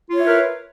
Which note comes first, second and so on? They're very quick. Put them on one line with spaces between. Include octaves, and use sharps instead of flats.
F4 C#5 E4 B4 A#4